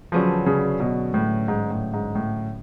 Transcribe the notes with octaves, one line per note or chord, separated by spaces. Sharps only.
D3 F3 F#3 C#4 G#4 B4
C#3
B2
A2
G#2
A2
G#2
A2